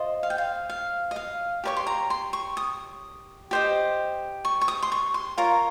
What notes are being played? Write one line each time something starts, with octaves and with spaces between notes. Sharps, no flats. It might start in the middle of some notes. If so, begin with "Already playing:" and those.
Already playing: F4 C5 D#5
F5
G5
F5
F5
D#5
F5
G4 A#4 C#5 C#6
C6
A#5
C6
C#6
D#6
G4 C5 D#5
C#6
C#6
D#6
C6
C#6
C6
F4 A#4 C#5 A#5